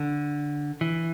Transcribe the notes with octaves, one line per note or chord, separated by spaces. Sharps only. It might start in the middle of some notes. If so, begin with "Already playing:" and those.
Already playing: D3
E3